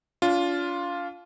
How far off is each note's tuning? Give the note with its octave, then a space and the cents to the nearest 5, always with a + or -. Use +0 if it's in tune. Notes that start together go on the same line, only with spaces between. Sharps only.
D4 -40 F4 +0